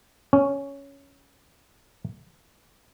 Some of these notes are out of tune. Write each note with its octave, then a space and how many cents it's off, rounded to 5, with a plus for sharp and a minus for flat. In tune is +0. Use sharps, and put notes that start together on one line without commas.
C#4 +5